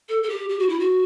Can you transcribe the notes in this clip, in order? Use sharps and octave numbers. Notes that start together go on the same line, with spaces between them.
A4
A4
G4
G4
F#4
E4
F#4